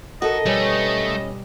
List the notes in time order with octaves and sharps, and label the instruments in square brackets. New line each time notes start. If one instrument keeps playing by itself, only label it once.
[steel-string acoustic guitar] F#4 A4 [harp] A#4 [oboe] D#5
[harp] B2 G3 [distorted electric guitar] A3 [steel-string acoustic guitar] C#4 B4